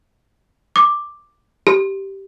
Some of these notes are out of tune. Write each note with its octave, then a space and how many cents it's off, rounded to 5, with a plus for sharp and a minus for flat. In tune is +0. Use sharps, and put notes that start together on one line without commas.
D6 +5
G4 -10